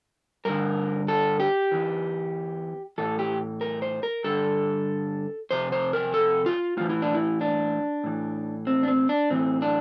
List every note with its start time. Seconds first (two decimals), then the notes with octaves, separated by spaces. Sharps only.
0.45 G2 D3 A#4
1.08 A4
1.40 G4
1.71 E2 E3
2.98 A2 E3 A4
3.19 G4
3.61 A#4
3.82 C5
4.03 A#4
4.24 G2 D3 A4
5.51 F2 C3 C5
5.72 C5
5.93 A#4
6.14 A4
6.46 F4
6.77 A2 E3 F4
6.90 E4
7.02 D4
7.14 E4
7.41 D4
8.04 A2 E3
8.67 C4
8.83 D4
8.88 C4
9.09 D4
9.30 A2 E3 C4
9.62 D4